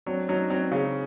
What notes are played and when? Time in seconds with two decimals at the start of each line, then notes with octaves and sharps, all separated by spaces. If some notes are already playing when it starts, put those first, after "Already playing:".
0.06 F#3 C4 D4
0.28 F#3 C#4 D#4
0.50 F#3 C4 D4
0.72 C#3